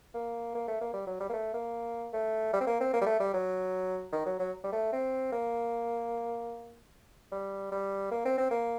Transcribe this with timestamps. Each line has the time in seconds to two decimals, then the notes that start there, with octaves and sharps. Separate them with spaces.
0.14 A#3
0.55 A#3
0.68 A3
0.81 A#3
0.93 G3
1.07 F#3
1.20 G3
1.29 A#3
1.33 A3
1.54 A#3
2.13 A3
2.53 G3
2.61 C4
2.67 A#3
2.80 C4
2.93 A#3
3.01 G3
3.06 A3
3.20 G3
3.34 F#3
4.12 D#3
4.26 F#3
4.39 F#3
4.64 G3
4.72 A3
4.93 C4
5.32 A#3
7.32 G3
7.72 G3
8.11 A#3
8.25 C4
8.38 C4
8.51 A#3